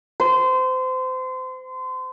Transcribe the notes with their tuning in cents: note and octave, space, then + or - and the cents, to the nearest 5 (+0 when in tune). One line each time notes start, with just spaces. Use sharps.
C5 -30